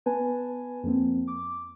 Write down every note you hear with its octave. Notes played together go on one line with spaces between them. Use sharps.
B3 B4 G#5 A5
F2 A#3 C4
D6